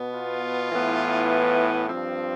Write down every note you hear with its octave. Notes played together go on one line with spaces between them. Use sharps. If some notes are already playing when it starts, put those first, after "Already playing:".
Already playing: B2 B3
F4
A2 E3 B3
G2 F3 C4